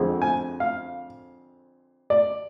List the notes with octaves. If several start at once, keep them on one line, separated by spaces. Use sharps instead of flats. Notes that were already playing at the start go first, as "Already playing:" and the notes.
Already playing: F2 D3 G#3 C4
G#5
F5
D5